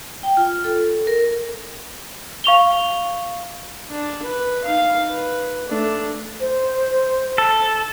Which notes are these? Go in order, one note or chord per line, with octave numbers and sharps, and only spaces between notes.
G5
F4
A4
A#4
F5 C#6 F7 G7
D4
B4
D#4 F5
B4
A3 D4
C5
A4